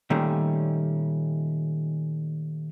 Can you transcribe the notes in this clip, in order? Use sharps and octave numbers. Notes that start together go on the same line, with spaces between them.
A#2 D#3 G3 A3 C#4